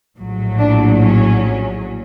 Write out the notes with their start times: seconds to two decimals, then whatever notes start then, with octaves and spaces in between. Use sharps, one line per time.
0.17 A#1 A2 F#3
0.58 D4
1.00 C#4